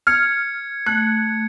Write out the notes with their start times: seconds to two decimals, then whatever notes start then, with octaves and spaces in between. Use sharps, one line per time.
0.07 F6 G#6 C#7
0.86 A3 F#6